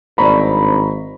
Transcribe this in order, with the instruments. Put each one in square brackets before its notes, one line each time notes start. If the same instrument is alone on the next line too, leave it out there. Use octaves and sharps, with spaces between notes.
[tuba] G#1 [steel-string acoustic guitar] G2 C4 D4 [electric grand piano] A#5 B5 C#6